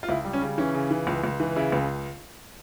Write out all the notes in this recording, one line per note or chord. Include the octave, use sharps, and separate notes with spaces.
F4
C#2 E4
G3
C#4
C#3
E3 C#4
C#3
E3
C#2
C#2
E3
C#3 E4
C#2